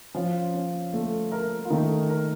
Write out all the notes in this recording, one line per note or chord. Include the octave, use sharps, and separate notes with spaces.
F3 C#4 F4
C#4
A3
A#4
F4
D#3 A3 D#4
A#4